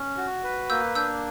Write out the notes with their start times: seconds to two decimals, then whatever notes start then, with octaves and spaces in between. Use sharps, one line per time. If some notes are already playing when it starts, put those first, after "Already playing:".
Already playing: C#4
0.17 F#4
0.44 B4
0.70 A#3 E6 G6
0.95 D4 E6 G6